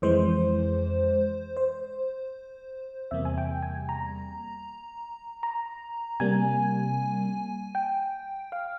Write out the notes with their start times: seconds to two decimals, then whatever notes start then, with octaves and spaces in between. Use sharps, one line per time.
0.02 F2 E3 G#3 C5
1.57 C5
3.11 E2 C3 G3 A#3 E5
3.25 G#5
3.38 G5
3.63 G#5
3.89 A#5
5.43 A#5
6.20 C3 G3 A#3 G#5
7.75 G5
8.52 F5